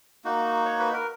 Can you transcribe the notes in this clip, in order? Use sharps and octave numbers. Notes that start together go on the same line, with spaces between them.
A#3 D#4 F#4
C#5
B4
A#4